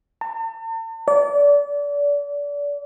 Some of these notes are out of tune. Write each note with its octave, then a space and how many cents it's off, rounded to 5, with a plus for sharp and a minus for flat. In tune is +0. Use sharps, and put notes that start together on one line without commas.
A5 +45
D5 -30